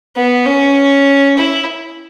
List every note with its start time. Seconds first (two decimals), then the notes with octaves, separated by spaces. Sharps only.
0.16 B3
0.46 C#4
1.37 E4